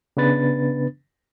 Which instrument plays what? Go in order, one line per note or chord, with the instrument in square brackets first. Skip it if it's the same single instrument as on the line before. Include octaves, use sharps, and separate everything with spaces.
[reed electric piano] C#3 B3 D4 B4 A6